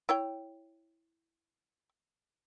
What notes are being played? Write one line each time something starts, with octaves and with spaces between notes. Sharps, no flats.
E4 C#5 G5